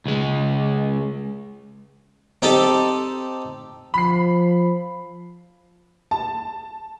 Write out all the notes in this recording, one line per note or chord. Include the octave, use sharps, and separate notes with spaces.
C#2 G#3
C4 D#4 G4 A4
F3 B5 C7
A5